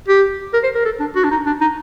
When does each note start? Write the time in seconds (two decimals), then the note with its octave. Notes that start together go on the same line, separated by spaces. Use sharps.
0.09 G4
0.54 A#4
0.64 C5
0.75 A#4
0.85 A4
1.00 D4
1.16 F#4
1.24 D4
1.31 D#4
1.46 D4
1.61 D#4